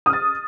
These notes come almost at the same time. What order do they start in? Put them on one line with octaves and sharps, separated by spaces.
D#6 F6 A6